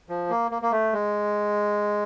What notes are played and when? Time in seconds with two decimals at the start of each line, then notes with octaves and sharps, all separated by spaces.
0.09 F3
0.30 A#3
0.51 A#3
0.62 A#3
0.72 A3
0.93 G#3